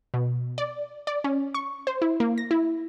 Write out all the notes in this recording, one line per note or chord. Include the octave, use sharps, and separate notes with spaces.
B2
D5
D5
C#4
C#6
C5
E4
A#3
A#6
E4